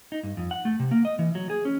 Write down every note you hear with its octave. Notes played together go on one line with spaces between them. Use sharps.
D#4
G2
F2
F#5
A3
C3
A#3
D#5
E3
F#3
G#4
C#4